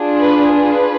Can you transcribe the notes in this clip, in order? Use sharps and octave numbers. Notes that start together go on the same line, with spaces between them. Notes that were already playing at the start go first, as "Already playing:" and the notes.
Already playing: D4 F4 G#4
B4
B4